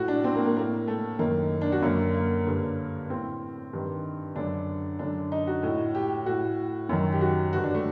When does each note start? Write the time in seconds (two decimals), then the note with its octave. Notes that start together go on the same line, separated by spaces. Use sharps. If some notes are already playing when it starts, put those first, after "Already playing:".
Already playing: A2 F#4
0.08 D4
0.24 C4
0.35 A#3
0.45 A#3
0.56 A2 A#3
0.88 A3
1.19 F#2 D#3 A#3
1.61 D4
1.72 F#4
1.82 F#2 D3 A#3
2.14 A#3
2.47 G2 D3
3.10 A2 C4
3.73 G2 D#3
4.36 F#2 D3 D4
4.99 F#2 D3 D4
5.32 D#4
5.47 F#4
5.63 A2
5.95 G4
6.26 A2 F#4
6.89 F#2 D#3
7.12 G4
7.21 F#4
7.53 G2 D3 F#4
7.64 D4
7.74 A3